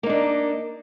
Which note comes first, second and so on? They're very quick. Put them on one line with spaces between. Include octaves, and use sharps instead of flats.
A#3 D#4 D4